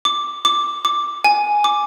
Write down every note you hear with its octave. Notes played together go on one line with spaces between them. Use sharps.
D6
D6
D6
G#5
D6